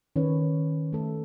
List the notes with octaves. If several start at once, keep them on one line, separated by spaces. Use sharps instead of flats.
D#3 C#4 B4 C#5
A3 A4